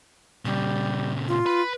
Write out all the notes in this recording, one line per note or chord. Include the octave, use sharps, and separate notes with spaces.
A#2 C#3 G3
F4
B4 B5